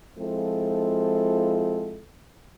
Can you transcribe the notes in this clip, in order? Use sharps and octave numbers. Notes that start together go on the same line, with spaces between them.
F3 G#3 C4 E4 F4 A4